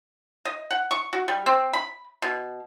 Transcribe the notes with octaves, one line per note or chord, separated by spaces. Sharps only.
D#5
F#5
C#6
F#4
G3
C4
B5
B2